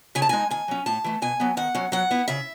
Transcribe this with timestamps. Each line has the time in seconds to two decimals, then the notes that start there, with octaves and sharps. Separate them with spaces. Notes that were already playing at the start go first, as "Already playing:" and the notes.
0.15 C#3 G#5
0.22 A5
0.29 G#3 D#4 G#5
0.50 D#3 G#5
0.68 F#3 C#4
0.86 A2 A5
1.04 E3 A3
1.22 B2 G#5
1.40 F#3 B3
1.57 D#3 F#5
1.75 F#3 C#4
1.92 F#3 F#5
2.11 B3 E4
2.28 C#3 E5